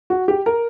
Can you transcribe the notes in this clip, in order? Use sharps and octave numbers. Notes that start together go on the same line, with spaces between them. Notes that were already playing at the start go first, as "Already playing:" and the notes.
F#4
G4
A#4